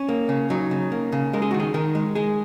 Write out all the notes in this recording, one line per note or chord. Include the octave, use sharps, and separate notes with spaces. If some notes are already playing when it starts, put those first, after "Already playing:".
Already playing: C#4
A#3
C#3
F#3 D#4
C#3
A#3
C#3
G#3 A#4
G#4
D#3 F#4
G#4
D#3 A#4
G#3
G#3 G#4